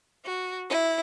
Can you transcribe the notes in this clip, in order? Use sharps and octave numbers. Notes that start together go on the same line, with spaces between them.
F#4
E4